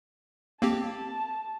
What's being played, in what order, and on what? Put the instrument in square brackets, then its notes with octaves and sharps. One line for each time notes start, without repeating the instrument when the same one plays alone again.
[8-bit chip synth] A#3 C4 G4 [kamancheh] A5